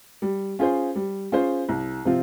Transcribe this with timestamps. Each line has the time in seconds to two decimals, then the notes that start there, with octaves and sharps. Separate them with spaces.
0.22 G3
0.59 C#4 F4 G#4 C5
0.95 G3
1.32 C#4 F4 G#4 C5
1.69 C2
2.05 C3 F3 C4 F4